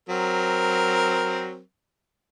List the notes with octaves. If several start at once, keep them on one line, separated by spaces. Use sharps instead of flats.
F#3 C4 A#4